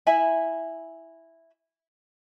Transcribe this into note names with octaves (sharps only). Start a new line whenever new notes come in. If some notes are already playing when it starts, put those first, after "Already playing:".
E4 E5 G#5 B5